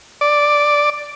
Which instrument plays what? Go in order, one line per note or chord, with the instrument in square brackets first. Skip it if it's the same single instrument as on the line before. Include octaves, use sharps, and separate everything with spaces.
[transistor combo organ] D5